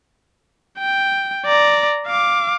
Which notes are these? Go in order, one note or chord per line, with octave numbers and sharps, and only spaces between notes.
G5
D5 A#5
F5 D6